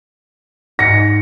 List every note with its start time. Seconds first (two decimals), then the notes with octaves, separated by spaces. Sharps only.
0.79 G#2 A#6 C#7